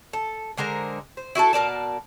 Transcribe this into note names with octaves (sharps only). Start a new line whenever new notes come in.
A4
D3 G#3 A#4 C5
C5
E4 F#4 G#4 A4
B2 A#4 D5 A5